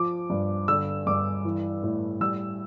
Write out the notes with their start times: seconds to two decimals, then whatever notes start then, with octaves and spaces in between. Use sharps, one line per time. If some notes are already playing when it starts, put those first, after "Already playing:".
Already playing: F3 D6
0.30 G2
0.68 D3 E6
1.07 G2 D6
1.45 E3
1.83 A2
2.20 G3 E6